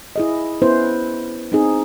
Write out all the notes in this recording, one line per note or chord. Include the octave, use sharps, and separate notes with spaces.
E4 G#4 D#5
B3 C#4 E4 B4 C5
C4 D#4 G#4